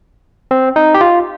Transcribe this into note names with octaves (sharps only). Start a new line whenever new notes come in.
C4
D#4
G4
F4